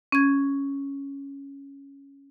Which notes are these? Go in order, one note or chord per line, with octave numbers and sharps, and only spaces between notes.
C#4 G#6